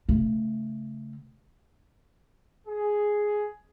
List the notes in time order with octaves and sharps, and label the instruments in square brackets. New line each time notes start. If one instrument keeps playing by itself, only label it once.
[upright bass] C#3 A3
[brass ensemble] G#4